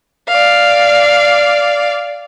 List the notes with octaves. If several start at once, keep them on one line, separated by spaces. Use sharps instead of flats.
D5 F5